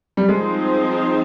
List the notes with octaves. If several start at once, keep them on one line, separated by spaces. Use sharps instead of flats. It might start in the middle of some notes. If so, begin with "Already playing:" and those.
G3
F3 G#3 C4 D#4 G#4 C5